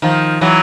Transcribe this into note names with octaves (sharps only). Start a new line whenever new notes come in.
D#3 F3
E3 F#3